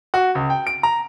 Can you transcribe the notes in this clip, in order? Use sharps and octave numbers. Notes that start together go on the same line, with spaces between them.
F#4
C#2
G5
D7
A#5